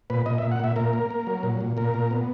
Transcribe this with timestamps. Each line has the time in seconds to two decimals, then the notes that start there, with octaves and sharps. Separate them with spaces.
0.10 A#2 B4
0.26 A#2 D#5
0.38 E5
0.42 A#2
0.52 F#5
0.60 A#2 E5
0.76 A#2 A#4
0.93 A#3
1.10 A#3
1.27 F#3
1.43 A#2
1.61 A#2
1.77 A#2 A#4
1.94 A#2
2.11 B3